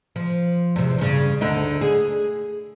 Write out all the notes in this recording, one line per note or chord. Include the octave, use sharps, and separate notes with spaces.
F3
E2 C3
G2 C#3
D2 D3 D#4
G#4